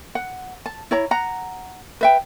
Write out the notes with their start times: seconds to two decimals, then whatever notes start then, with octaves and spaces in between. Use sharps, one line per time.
0.15 F#5
0.66 A5
0.91 E4 C#5 A#5
1.11 F#5 A#5
2.01 B4 E5 G5